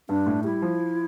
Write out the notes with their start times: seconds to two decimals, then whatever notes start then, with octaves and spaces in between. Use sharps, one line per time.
0.09 G2 D4
0.26 A2
0.44 G3 E4
0.62 F3